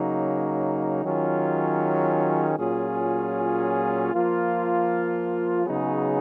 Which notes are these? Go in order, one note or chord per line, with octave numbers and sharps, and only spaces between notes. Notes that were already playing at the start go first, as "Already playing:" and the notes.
Already playing: C#3 F#3 A#3 D#4
D#3 F#3 C#4 F4 G#4
A#2 F#3 C#4 F4 G#4
F3 A#3 F4
C#3 F#3 B3 D#4 G#4